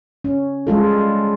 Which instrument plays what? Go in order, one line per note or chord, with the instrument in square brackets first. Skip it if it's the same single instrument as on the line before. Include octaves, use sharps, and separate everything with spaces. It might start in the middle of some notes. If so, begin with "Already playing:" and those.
[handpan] C#4
G3 G#3 F4 A4